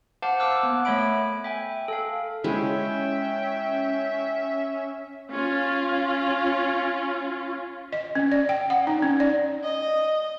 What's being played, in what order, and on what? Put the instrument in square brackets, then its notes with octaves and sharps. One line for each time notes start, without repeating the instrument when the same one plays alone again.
[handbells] C5 F5 F#5 A5 D6
A#4 A5 D6 E6 F#6
B3
A3 C#5 E5 B5 D7
E5 G5 G#5
A4 F5
[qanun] G#3 E4 [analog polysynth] C#4 [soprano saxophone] E5 [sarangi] G5
[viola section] C#4 F4
[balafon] D#5
C#4
D5
G5
F#5
D#4
C#4
D5
[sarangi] D#5